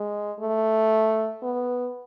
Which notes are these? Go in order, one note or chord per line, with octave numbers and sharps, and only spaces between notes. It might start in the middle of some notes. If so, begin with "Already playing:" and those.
Already playing: G#3
A3
B3